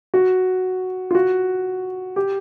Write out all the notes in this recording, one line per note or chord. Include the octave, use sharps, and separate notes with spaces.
F#4
F4
F#4
G4